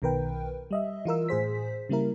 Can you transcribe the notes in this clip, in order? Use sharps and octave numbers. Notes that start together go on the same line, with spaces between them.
B1 B2 D#3 A#4 B4 G5
G3 D#5 E5
E3 F4 A#4 E6
A2 G#4 C5 B6
C#3 G3 A#3 E4 A#4